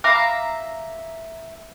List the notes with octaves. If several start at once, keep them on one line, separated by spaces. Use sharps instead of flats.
E5 F5 A#5 D6